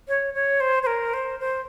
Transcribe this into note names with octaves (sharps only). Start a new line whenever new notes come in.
C#5
C#5
C5
C5
A#4
C5
C5